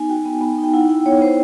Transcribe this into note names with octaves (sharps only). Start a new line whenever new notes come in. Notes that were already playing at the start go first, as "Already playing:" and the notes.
Already playing: B3 D#4 G#5
F#4 G5
B3
B3
D#4
G5
E4 F#5
E4 G5
B3 C#5
B3 C5